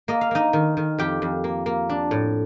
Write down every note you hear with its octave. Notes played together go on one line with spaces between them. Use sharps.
A#3 D#5
F5
A#3 D#4 D#5
D#3
D#3
F2 G4 G5
F2
A#3
A#3
D4
A2